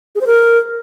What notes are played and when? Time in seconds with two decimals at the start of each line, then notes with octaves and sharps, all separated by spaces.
0.15 G#4
0.21 C5
0.27 A#4